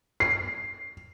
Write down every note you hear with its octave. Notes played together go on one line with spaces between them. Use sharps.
C7